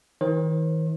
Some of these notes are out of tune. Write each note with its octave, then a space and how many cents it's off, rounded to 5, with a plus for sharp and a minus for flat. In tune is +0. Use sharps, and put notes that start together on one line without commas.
D#3 +45 C5 +40